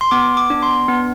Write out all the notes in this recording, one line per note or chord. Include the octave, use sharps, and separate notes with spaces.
C6
B3 D6
D6
D4
C6
B3